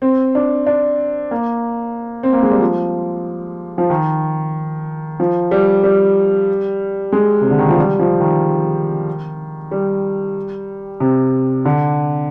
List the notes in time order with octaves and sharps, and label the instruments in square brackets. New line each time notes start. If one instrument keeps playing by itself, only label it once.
[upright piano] C4
D4
D4
A#3
C4
A#3
G#3
G3
F3
F3
D#3
F3
G3
G3
G#3
C3
D3
D#3
F3
G3
F3
D#3
G3
C3
D3